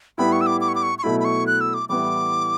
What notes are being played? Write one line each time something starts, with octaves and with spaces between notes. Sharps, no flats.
A2 G3 B3 E4 B5
C#6
E6
D6
D6
C#6
D6
C#6
C#6
B2 F#3 A3 E4 B5
B5
C#6
F#6
E6
D6
A2 E3 G3 B3 E4 D6